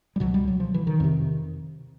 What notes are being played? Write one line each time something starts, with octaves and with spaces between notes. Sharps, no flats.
G3
C#2 B2 F#3
G3
F#3
F3
E3
D#3
F2 C3